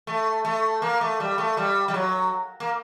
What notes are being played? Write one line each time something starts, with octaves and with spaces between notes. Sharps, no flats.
A3
A3
A#3
A3
G3
A3
G3
G3
F#3
A#3